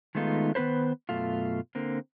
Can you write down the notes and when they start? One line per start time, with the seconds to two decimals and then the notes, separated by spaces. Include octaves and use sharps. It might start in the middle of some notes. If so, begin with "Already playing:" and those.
0.15 D#3 G#3 A3 B3 D#4 F4
0.55 D#3 B3 D#4 B4 C5
1.09 F#2 B2 A3 F4
1.75 D3 A#3 C4